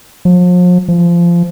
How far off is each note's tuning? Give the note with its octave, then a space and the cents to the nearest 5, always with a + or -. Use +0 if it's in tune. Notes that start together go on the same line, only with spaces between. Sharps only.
F3 +40
F3 -20